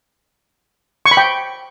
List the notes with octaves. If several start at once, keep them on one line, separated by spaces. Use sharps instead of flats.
C#6
B5
G5